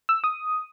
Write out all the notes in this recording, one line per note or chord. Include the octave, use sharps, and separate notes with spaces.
E6
D#6